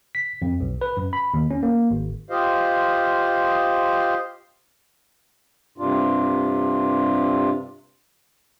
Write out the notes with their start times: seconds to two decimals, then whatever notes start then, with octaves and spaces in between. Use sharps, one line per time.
0.15 B6
0.42 F2
0.60 B1
0.81 B4
0.97 F#2
1.13 B5
1.34 D#2
1.51 C#4
1.63 A#3
1.91 G#1
2.30 F4 G4 C5 D#5 F5
5.78 G2 C3 D4 F4